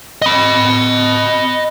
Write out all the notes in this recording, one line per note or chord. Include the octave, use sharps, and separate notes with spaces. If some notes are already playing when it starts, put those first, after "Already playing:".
D#5 B5